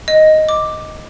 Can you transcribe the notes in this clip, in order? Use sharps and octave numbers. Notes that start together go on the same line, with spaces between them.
D#5
D6